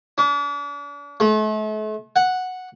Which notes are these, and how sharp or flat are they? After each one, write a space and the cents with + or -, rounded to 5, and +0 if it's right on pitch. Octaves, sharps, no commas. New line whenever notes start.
D4 -40
A3 -40
F#5 -5